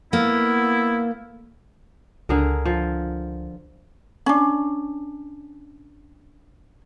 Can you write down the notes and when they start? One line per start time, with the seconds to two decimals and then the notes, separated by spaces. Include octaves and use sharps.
0.13 A#3 B3 E4
2.29 C#2 D3 G#4 A#4
2.65 F3
4.26 C#4 D4